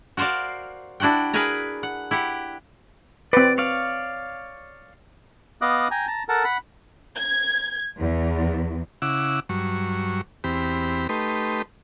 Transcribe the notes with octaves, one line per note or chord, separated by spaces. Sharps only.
F#4 A#4 C5 D5 F5
D4 E4 F#4 F#5 G5
G#4 A#4 B4 E5 G#5 A#5
F#5
E4 G4 F#5
C4 B4 D5
C#5 D5 F5
B3 D#5 F5 D6 D#6 F#6
G5 G#5 A#5
A5 A#5
A4 A#4 F#5 A5
F#5 B5
G#6
E2
C#3 E4 F#5 D6 E6
G2 F#3 C#6
E2 C4 G4 B5
A3 D#4 G4 B4 C6